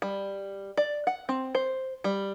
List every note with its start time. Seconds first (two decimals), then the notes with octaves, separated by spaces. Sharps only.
0.02 G3
0.77 D5
1.07 F#5
1.29 C4
1.55 C5
2.04 G3